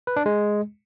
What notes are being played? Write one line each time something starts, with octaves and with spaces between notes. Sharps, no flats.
B4
D4
G#3